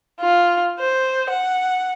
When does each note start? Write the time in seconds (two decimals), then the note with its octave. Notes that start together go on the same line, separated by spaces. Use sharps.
0.20 F4
0.80 C5
1.30 F#5